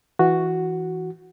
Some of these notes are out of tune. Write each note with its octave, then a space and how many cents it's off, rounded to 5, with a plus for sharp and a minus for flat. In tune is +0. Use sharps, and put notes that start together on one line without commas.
E3 +0 F#4 +0